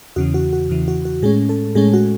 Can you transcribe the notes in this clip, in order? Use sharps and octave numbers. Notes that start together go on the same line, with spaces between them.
E2 C#3 E3 F#4
F#4
F#4
E2 C#3 E3
F#4
F#4
A2 G#3 C#4 G#4
A4
A2 G#3 C#4 G#4
F#4